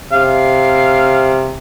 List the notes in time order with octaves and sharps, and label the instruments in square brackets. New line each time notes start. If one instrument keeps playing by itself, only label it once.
[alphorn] C3 [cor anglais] F5